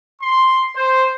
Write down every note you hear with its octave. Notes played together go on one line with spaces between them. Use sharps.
C6
C5